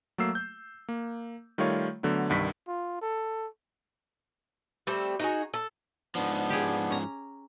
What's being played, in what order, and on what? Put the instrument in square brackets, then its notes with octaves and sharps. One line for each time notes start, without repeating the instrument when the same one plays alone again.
[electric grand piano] F#3 A3 A#3 E6 C7
G6
A#3
D#3 G3 A3 F4 C#5
D3 F#3 A3 B3
C2 G2 D#3 B6
[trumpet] F4
A4
[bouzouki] G3 A3 C4
D#4 F#4 G#4
A4
[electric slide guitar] G#2 F3 [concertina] B3 D4
[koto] G4 G#4
C#4 A#5